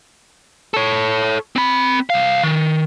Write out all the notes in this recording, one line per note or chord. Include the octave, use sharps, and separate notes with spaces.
A4 C#5
C4 B5
C2 F5
D#3